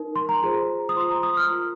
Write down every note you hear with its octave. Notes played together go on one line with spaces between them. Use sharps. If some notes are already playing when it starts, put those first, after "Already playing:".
Already playing: D#4 A#4
C6
A#5
F4 G#4 C5 A#5
D#6
F4 C5 C6
A#5
D#6
F6
F4 A#4